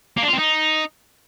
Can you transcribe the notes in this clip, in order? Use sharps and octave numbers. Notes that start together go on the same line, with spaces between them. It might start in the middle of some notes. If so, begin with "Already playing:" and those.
A#3
D4
F4
C4
D#4